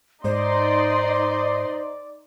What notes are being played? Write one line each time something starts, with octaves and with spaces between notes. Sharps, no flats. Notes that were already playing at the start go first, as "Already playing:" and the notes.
G#2 D#4 C5 D5 D#5 C6